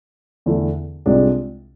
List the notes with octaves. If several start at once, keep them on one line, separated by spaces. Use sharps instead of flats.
E2 D3 A3 E4 A4
C2 C3 G#3 D4 F4